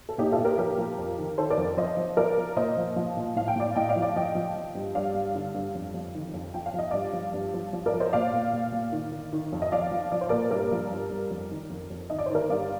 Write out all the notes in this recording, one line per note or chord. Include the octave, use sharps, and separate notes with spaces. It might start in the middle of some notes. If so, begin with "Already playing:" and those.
A4
A#2 D#4 G4
F4 A4
A#2
G4 A#4
F3 G4 A#4
F3
F2
D#3
D#3 A4 C5
A#4 D5
F2
F3 C5 D#5
F3
F3 A#4 D5
F3
A#2 C5 D#5
F3
F3
A#2
A2 F5
G5
A2 D5 F5
A2 D#5 G5
D5 F5
F3
D5 F5
F3 D#5 G5
F3
F3
G2
G2 D5 F5
G2
D3
G2
F2
F2
D#3
F2
F3 G5
F5
F3 D#5
G2 D5 F5
F3
G2
F3
F3
A#4 D5
F3
C5 D#5
A#2 D5 F5
A#2
A#2
A#2
D#3
D#3
D#3
F2
D#5
F3 D5 F5
F3
F3 D5
C5
A#2 A#4 D5
G2 A#4 D5
F3
G2
G2
F2
D#3
F2
F2
D#3 D#5
D5
C5
D#3 A#4 D5
G2 D5 F5